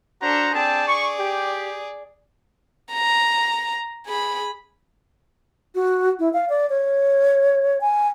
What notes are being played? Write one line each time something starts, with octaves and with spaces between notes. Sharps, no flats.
D4 F#4 A4 C5 A#5
C4 G#4 D5 G5 A5
C#6
G4
A#5
G#4 B5
F#4
E4
F5
D5
C#5
G#5